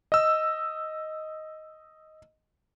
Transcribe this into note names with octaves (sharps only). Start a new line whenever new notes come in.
D#5 E6